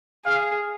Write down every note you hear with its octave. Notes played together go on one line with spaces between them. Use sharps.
G#4 F5